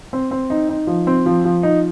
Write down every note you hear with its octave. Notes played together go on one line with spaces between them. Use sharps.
C4
C4
D#4
D#4
F3
C4
F3
F3
D#4